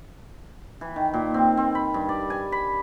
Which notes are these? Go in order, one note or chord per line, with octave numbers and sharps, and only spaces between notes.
E3
D#3
A#2
C4
C4
B5
G2
D5
G#5
B5